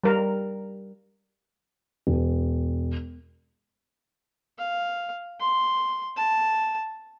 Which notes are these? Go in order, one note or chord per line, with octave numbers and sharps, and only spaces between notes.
G3 A#4
E1
F5
C6
A5